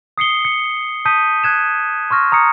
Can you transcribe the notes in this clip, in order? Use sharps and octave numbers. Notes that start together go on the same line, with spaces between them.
D#6 C7 C#7 G7
C#7
A5 D#6 G6 B6 D#7
F#6 G#6 E7
C6 C#6 F6 A#6
A#5 D#6 G#6 C#7